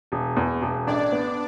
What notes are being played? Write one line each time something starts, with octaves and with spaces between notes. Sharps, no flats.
E1
E2
E1
A1 D4 D5
B3